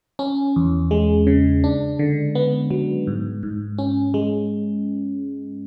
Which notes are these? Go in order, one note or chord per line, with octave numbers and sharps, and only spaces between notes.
C#4
E2
G#3
C#3
D4
D3
B3
F#3
G#2
G#2
C#4
G#3